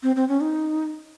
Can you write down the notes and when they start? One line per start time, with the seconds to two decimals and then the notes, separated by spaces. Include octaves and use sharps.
0.03 C4
0.16 C4
0.29 C#4
0.41 D#4